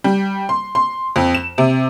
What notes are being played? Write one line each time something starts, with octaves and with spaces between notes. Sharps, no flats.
G3
C6
C6
F2
E7
C3